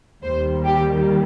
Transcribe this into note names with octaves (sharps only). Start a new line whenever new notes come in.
D#2 D#3 G3 A#3 C5
G4